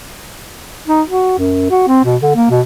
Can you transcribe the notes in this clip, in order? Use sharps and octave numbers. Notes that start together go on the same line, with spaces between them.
D#4
F#4
F#2
F#4
C4
B2
D3
A#3
B2